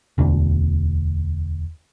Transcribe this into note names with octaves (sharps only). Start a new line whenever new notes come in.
E1 D2 D3 D4